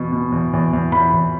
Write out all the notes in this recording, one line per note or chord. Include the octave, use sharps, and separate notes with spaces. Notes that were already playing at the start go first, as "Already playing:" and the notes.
Already playing: E2 B2
B2
E2
E2
E2
E2 B5
E2